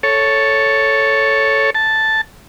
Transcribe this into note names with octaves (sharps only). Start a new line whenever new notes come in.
A4 C#5
A5